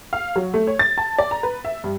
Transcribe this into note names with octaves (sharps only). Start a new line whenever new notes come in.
F5
F#3
A3
C#5
A6
A5
D5
A#5
B4
E5
G2